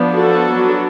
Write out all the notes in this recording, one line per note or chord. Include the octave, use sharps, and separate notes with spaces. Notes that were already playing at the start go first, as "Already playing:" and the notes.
Already playing: F3 B3 D4
F#4 A4
F#3 B3 D4